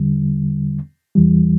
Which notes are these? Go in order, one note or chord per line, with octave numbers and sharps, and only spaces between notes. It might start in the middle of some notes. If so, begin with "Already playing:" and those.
Already playing: E2 D3 G3
E2 E3 G3